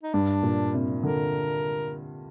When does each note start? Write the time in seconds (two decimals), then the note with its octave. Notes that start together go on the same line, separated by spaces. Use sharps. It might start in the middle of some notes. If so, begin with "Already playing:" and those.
0.03 D#4
0.13 G2 D4
0.43 A#2
0.74 C3
1.03 D3 A#4